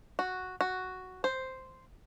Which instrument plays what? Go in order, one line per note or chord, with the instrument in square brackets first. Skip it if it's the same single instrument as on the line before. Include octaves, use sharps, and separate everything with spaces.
[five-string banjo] F#4
F#4
C5